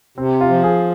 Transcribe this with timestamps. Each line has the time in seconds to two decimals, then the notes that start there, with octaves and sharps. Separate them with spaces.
0.18 C3 C4
0.41 F4
0.49 F3
0.64 G#4